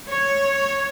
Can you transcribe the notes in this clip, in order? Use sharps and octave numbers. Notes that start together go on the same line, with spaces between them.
C#5